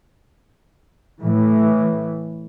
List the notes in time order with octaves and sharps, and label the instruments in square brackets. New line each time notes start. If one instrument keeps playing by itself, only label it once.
[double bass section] A2 E3